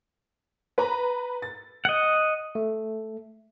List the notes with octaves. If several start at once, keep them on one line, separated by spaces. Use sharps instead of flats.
B4 A#5
A6
D#5 F#5
A3